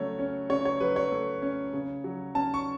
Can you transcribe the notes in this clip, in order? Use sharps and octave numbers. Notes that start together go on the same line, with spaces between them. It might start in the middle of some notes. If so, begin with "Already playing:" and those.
Already playing: C#3 F#3 A3 C#5
C#4
C#3 C#5
C#5
F#3 B4
C#5
A3
C#4
C#3
F#3
C#4 A5
C#6